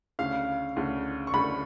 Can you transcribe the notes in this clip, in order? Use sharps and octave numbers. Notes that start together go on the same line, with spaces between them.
D2 C#3 F5
D2 C#3
C#6
D2 C#3 B5